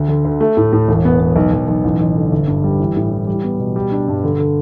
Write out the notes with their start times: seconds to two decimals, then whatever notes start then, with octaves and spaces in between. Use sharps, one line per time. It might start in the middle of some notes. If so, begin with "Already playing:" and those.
Already playing: D2
0.08 D3
0.25 D2
0.41 A3
0.57 A2
0.73 A2
0.88 E1
1.05 B3
1.20 B3
1.36 B1
1.53 B1
1.68 B1
1.84 A1
1.99 A1
2.16 D3
2.32 G1
2.47 G2
2.64 G3
2.79 E3
2.96 A2
3.12 E3
3.27 G3
3.44 B3
3.60 B2
3.76 G3
3.91 D4
4.08 G2
4.24 D3
4.39 D3